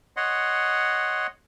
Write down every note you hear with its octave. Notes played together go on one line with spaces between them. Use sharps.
C#5 D#5 F#5 C6